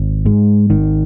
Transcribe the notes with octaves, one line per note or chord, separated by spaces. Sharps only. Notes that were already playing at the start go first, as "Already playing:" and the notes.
Already playing: G#1
G#2 G#3
G#1 D#3